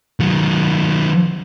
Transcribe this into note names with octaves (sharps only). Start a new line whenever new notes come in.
D#3 F#3